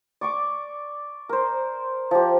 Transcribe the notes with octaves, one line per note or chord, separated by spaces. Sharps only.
D5 C#6 D6
A#4 C5
F3 G4